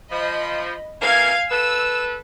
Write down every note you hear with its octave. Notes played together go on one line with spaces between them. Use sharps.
F3 D#5 B5
C3 E3 A#3 F5 G#5 G#6
A4 B4 E6